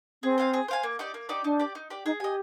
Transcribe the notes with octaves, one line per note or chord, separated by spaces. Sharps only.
C4 G#4
C5 F5 G#5
G#4
C5 F5 G#5
A#3
D#4 G4 D5
A#3
D#4 G4 D5
D4 D#4
G4 D5
D#4
G4 D5
D#4 G#4
G4 D#5 G#5